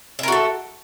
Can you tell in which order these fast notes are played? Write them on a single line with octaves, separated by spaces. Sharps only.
E5 A#4 F#4 A4